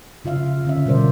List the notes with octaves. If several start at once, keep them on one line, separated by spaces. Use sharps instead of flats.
C#3 F4 E5 F5
D3 C#4 E5
B2 D3 G3 A#4 C5 D5